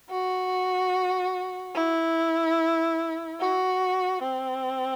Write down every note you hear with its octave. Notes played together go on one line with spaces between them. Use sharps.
F#4
E4
F#4
C4